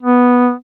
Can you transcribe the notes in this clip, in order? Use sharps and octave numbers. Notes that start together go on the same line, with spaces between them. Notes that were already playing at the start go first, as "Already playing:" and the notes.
B3